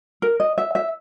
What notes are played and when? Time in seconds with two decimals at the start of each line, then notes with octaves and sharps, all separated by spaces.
0.22 A#4
0.40 D#5
0.58 E5
0.75 E5